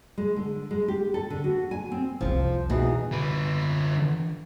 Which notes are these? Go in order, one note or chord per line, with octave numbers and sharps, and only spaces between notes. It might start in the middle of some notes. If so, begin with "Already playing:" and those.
G#3
D3
G#3
G4
A4
D3
F#4
G#5
C4
F1 C2 F3
E2 B2 D#4
D3 B4